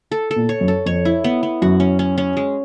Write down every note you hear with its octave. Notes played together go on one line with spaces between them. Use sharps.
A4
A4
A#2
C#5
F#2
A4
F2 C#5
E4
B3
B3
F#2 F#4
C#4
C#4
C#4
G#3